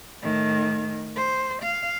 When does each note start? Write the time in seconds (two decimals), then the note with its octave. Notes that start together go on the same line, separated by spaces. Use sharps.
0.22 A2 D#3
1.16 C5
1.63 F5